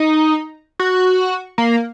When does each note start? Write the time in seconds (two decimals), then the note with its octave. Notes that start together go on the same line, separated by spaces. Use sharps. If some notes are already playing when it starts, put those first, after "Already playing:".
Already playing: D#4
0.79 F#4
1.58 A#3